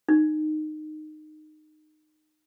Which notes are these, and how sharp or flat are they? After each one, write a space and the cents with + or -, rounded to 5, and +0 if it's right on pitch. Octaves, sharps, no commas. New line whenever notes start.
D#4 -20